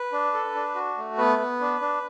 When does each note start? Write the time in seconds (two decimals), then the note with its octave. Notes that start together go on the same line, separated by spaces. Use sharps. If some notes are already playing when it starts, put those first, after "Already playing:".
Already playing: B4
0.12 D4
0.34 A4
0.55 D4
0.75 F#4
0.97 A3
1.18 B3 B4
1.39 B3
1.60 D4
1.81 D4